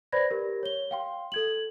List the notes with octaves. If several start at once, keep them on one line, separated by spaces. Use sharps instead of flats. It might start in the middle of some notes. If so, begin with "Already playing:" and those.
B4 C5 D5 B5 G#6 A#6
G4 A#4
C#5 G7
F5 G5 C6
A4 G#6 F#7